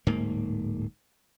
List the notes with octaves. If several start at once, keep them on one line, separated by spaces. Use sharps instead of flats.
D1 G#2 A#3